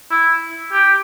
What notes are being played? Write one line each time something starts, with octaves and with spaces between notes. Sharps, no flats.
E4
G4